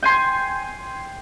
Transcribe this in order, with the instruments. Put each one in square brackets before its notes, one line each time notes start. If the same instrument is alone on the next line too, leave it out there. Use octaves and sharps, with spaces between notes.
[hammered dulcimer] G5 G#5 C6